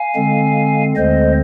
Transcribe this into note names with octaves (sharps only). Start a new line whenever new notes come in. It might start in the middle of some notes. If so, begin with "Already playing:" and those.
Already playing: F5 G#5
D3 G#3 C4
D2 D3 G#3 C4 C5 D#5